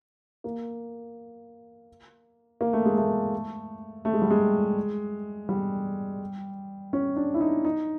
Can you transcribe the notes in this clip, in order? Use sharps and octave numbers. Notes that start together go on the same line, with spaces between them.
A#3
A#3
A3
G#3
A3
A3
G#3
G3
G#3
G3
C#4
D4
E4
D#4
D#4